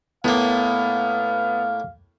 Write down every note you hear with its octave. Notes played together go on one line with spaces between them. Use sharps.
A2 A#3 B3 F5